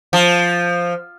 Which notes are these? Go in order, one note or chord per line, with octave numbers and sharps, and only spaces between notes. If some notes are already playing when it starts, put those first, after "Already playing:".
F3